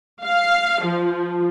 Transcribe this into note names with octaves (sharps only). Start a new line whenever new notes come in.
F5
F3